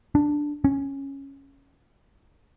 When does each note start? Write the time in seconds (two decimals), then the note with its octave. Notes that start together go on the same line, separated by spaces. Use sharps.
0.15 D4
0.64 C#4